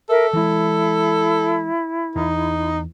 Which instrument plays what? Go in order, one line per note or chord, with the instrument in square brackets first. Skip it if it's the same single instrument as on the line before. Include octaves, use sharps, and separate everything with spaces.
[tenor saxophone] A4 [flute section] A#4 E5
[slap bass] E3 G#3 [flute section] E4
[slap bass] E2 [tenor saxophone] D#4